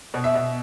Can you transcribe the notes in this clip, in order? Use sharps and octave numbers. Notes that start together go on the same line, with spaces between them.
B2
E5
B2